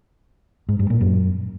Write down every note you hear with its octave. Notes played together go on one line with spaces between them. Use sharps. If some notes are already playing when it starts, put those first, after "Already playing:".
G#2
G2
A#2
F#2